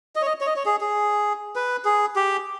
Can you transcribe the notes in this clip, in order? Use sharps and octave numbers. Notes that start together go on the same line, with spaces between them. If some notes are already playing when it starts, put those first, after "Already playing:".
D#5
C#5
D#5
C#5
D#5
C#5
G#4
G#4
B4
G#4
G4